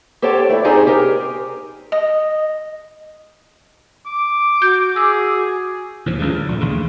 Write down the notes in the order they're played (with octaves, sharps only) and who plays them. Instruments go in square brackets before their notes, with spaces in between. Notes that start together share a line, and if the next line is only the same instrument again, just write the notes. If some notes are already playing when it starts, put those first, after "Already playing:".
[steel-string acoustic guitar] G4 A4 C5 C#5 G5
A3 E4 D5
C4 D#4 G4 G#4 C5 C#5
G4 G#4 A#4
[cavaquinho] D#5
[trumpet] D6
[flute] F#4 [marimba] G6
[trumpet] G#4 [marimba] D6 E6
[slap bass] D#2 A2 F3
C#2 G2 C#3
D3
A#1 G2
A1 D#2 C#3